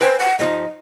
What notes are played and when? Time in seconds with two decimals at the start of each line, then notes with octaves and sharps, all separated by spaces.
0.01 B4 C5 G5 G#5
0.20 F#5
0.39 G2 F3 D#4 D#5